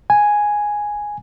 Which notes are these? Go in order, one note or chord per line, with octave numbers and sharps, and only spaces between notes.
G#5